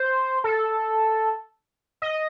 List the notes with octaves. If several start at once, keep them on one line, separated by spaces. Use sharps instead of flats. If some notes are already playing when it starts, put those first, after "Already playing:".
Already playing: C5
A4
D#5